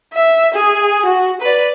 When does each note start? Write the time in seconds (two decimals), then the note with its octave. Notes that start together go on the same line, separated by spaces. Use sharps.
0.14 E5
0.54 G#4
1.06 F#4
1.42 B4 D5